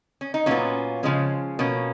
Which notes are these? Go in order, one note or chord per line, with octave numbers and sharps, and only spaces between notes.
C#4
D#4
A#2 F#3 B3 C#4 F4
C#3 F3 G#3 C#4
B2 A#3 C#4